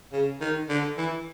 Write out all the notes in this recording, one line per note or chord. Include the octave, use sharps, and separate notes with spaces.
C#3
D#3
D3
E3